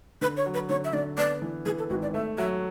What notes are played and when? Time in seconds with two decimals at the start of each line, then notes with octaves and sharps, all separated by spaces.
0.21 D3 B4
0.37 C#5
0.46 F#3
0.54 B4
0.69 D3 C#5
0.85 E5
0.93 D3 D5
1.18 B3 D5
1.42 E3
1.66 E3 G#4
1.79 A4
1.90 G#1 F#4
2.02 D5
2.14 A3 E5
2.38 F#3 E5